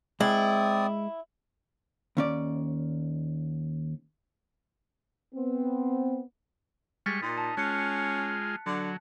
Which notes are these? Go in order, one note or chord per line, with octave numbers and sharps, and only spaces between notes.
G#3 C4 E4 D5 D#6
D#2 C#4 D5
B3 C4
G3 G#3 C#6 F6 A6 B6
A#2 D#4
A5
G#3 C#4 F4 F#6 C#7
D3 F#3